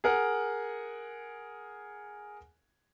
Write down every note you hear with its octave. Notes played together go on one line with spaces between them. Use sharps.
G#4 A#4 F#5